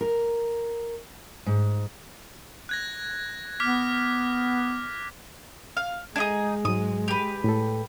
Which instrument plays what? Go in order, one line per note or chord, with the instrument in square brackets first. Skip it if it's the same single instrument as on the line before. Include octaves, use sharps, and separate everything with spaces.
[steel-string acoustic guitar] A#4
G#2
[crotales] F#6 G#6 A#6
[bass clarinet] B3 [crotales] D6 F6 B6
[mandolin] F5
[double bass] G#3 [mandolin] D4 D#4 G#4 [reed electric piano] G#6
[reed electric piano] G#2 F#3 [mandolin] D#6
[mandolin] G4 B4
[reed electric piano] A2 A4